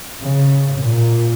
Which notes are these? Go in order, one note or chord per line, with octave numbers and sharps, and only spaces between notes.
C#3
A#2